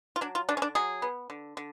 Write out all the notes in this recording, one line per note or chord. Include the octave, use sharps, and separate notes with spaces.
F4
F#3 D4
F4
D3 D4
C#4
D4
F#3 G#4
B3
D3
D3